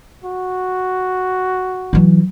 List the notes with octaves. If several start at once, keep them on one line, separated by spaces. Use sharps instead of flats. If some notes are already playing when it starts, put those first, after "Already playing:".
F#4
E3 F#3